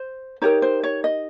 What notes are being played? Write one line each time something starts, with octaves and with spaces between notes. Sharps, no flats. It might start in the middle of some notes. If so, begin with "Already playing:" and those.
Already playing: C5
D#4 G4 A#4 C#5
C5
C#5
D#5